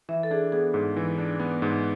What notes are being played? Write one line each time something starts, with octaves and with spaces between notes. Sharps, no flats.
E3 E5
A4
D4 G#4
B3 G#4
G#2
E3
D4
B3
G#2